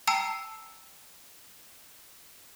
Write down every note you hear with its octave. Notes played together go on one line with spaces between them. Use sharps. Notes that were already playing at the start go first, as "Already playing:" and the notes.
G5 A5 A#5 E6 C7